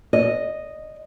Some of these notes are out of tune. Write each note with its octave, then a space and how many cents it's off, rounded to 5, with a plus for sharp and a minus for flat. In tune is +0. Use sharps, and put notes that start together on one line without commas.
D#5 -5